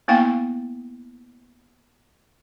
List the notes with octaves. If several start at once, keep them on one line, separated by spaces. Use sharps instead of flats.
A#3 B3 E4 F5 G5